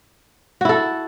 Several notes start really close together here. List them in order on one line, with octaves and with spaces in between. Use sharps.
F#4 E4 A4